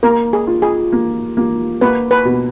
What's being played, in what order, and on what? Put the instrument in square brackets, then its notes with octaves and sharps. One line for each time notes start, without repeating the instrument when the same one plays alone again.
[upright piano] A#3 [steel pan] A#4
[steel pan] G#4
[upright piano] F4
[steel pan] G#4
[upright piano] A#3
A#3
[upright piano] A#3 [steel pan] B4
[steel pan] B4
[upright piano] B2